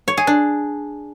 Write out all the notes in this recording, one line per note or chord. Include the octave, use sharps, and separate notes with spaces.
C#5
G#4
D4